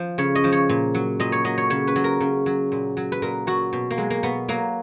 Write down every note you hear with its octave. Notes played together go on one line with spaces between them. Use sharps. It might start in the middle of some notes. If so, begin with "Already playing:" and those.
Already playing: F3
C#3 C#5
D#5
F3
C#5
A#2
F#3
A#2 D#5
C#5
F#3 D#5
C#5
C#3 C#5
B4
F#3
A#4
C#3
F#3
A#2
F#3
B4
A#2 A#4
F#3 F#4
B2
A#3
F#3 G#3
A#3
B2 B3
F#3 A#3